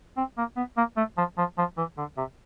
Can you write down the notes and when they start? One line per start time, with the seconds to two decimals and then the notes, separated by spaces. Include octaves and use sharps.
0.17 C4
0.37 A#3
0.56 B3
0.77 A#3
0.97 A3
1.17 F3
1.38 F3
1.58 F3
1.77 E3
1.98 D3
2.17 C3